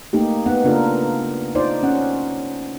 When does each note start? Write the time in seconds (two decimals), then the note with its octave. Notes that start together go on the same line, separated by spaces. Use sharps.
0.13 A3 A#3 D#4 G4
0.46 B3 D#4 F#5
0.64 C#3 A#3 D4 F4 A4 A#4
1.55 D#4 F4 C5 D5
1.83 C#4 F#5